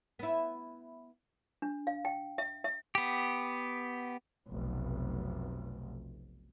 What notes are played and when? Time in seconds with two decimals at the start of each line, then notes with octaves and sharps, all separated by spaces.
0.19 B3 E4
1.62 D4
1.87 F5
2.05 G5
2.38 E5
2.64 E5
2.95 B3 G4
4.49 F1 B1